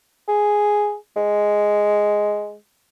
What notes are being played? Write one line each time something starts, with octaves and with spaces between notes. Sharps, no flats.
G#4
G#3